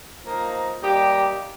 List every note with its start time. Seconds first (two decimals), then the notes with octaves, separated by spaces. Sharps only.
0.24 F3 A#3 D#4
0.80 G3 A#3 D#4 G4